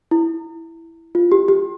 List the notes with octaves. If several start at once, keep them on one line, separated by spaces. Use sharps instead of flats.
E4
F4
G4
G4